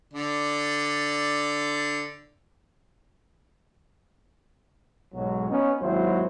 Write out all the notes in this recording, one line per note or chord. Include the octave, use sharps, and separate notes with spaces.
D3 D5
B1 G#2 F#3
B3 C#4 D#4
G#1 D#2 F#3 G#3 E4 C5